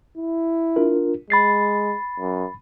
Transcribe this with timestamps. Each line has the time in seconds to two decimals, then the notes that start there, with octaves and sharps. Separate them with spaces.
0.17 E4
0.76 D4 F4 A#4
1.30 G#3 B5 A6 C7
2.19 F#2